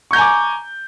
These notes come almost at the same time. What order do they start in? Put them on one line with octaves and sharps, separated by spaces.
C#6 G6 A#5 G#5 D6